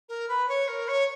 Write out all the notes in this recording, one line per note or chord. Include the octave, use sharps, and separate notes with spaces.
A#4
B4
C#5
A#4
C#5